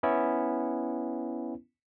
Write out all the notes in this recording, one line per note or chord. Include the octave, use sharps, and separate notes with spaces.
B3 C#4 E4